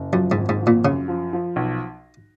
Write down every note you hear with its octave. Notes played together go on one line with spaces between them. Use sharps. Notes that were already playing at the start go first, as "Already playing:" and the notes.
Already playing: F#1
F#2 F3
G#2
G#1
G#2
F3
A#2
F#2 C#3
F3
F3
B1